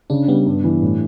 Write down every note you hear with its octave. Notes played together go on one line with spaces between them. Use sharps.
C#3 D4
G3 B3
G2
E3
A2